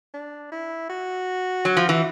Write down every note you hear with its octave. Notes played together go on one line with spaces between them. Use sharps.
D4
E4
F#4
F#3
F3
E3